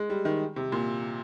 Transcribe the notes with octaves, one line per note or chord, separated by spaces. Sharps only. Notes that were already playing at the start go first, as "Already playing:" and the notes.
Already playing: G#3
G3
D#3
C3
A#2